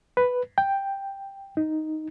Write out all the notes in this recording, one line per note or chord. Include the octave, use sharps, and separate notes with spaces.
B4
G5
D#4